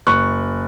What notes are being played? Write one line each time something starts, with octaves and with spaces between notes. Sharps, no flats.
F#1 C#6 F#6